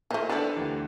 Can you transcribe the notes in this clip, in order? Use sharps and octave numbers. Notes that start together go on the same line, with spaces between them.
A#2 E3 A3 C5 D#5
A#3 B3 D4 E4 G4 A4 B4 A5
D2 E3